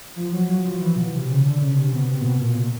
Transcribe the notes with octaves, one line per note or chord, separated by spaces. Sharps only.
F3
F#3
F#3
F3
E3
B2
C3
C#3
D3
C#3
C3
B2
C3
A#2
B2
A#2